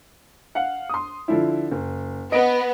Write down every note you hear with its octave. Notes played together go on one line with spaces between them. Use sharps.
F5 F#5
C6 D#6
D3 F3 E4
F#1
B3 D#5 D7